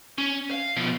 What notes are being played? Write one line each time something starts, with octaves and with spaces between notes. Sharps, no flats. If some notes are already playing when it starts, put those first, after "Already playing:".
C#4
F5
B2 F3